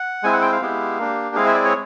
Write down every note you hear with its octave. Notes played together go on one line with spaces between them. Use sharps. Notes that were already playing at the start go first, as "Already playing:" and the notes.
Already playing: F#5
G#3 C4 E4 G#5
F#5
G5
F5
G#3 B3 E4 G4
A#3 D4 G4
G#3 C4 E4 G#4 F5
E5
D5
C#5